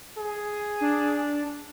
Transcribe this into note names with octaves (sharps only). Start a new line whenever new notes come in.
G#4
D4